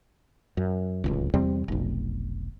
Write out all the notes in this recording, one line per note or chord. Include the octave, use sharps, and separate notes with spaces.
F#2
D1 G1 C#2
E2 C3 G3 C4
F1 B1